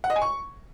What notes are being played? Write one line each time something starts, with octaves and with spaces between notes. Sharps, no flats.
F#5
D#5
G#5
C#6